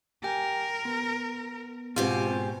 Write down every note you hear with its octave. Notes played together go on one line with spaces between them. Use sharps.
G4 A#4 G5 G#5
B3
G#2 B2 C4 F4 G4 G#5